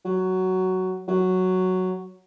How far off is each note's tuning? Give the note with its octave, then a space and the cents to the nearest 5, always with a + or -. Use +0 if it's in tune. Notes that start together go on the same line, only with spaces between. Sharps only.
F#3 +10
F#3 +0